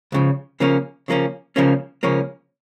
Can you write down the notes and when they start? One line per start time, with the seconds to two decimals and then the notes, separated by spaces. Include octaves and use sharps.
0.12 C#2 C#3 F3
0.60 C#3 F3 A#3 C#4
1.08 C#3 F3 A#3 C#4
1.56 C#2 C#3 F3 A#3 C#4
2.03 C#2 C#3 F3 A#3 C#4